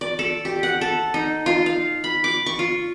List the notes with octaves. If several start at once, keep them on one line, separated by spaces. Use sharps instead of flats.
D5
A4
G4
F#5
A4
D#4
F4
F5
B5
D6
C#6
F4